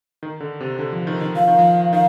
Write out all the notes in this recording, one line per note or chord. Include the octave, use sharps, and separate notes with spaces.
D#3
D3
C3
D3
F3
D#3
D#3
F3 F5
D#3
F3
D#3 F5